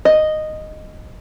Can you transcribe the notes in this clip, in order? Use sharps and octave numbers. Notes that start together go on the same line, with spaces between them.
D#5